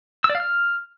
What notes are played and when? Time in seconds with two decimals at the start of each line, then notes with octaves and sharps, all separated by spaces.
0.24 E6
0.30 D5
0.35 F5
0.40 F6